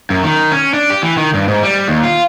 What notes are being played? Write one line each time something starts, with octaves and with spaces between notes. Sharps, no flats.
F#2
D#3
C#4
D4
G4
E3
D#3
G2
G#2
G3
D#2
F4